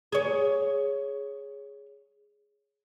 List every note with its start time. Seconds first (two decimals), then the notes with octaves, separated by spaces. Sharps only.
0.12 G#4 C#5